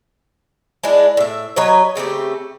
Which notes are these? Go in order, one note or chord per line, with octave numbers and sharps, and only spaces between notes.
G#3 D4 E4
A2 E5
F#3 B4 C#5 D#5
C#3 A3 C4 G4